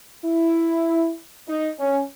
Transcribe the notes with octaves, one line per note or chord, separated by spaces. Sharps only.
E4
D#4
C#4